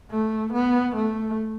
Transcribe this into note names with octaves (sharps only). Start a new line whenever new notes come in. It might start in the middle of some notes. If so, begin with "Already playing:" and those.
A3
B3
A3